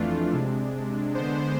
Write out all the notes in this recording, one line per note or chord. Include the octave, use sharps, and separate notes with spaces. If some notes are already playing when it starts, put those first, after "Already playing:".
Already playing: F2 E3 A3 D4 F4
C3 G#3 D4
D3 G#3 B3 D4 C5